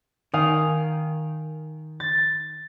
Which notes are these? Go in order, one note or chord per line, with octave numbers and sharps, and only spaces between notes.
D#3 F5 G#5 D#6
A6